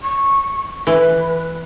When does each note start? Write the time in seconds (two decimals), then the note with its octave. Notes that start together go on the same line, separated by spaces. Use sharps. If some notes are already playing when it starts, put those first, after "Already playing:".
0.02 C#6
0.87 E3 B4